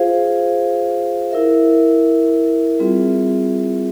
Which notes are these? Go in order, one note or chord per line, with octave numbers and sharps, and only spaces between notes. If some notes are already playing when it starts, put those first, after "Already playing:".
Already playing: F4 G#4 C5 F5
E4 A#4 E5
G3 C4 F4 G#4 E5